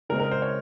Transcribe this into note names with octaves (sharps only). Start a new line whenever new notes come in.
C#3 G#3 C4 A#4
A#4
C5
C#5